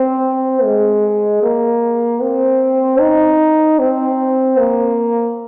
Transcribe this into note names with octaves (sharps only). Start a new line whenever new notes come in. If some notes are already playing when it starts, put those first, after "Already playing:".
Already playing: C4
G#3
A#3
C4
D#4
C4
A#3